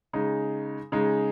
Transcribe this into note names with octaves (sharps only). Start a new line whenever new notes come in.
C#3 G#3 D#4
C#3 G#3 D#4